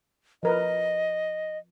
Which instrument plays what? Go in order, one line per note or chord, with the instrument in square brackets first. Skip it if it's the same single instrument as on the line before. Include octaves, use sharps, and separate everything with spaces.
[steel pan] F3 A#4 B4 [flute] D#5